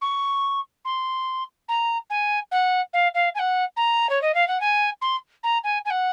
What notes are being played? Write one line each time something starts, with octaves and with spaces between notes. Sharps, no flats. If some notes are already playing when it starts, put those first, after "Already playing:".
C#6
C6
A#5
G#5
F#5
F5
F5
G#5
F#5
A#5
C#5
D#5
F5
F#5
G#5
C6
A#5
G#5
G#5
F#5